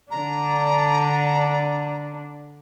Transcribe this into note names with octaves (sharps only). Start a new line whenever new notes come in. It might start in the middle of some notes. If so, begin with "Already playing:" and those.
D3 D4 A#5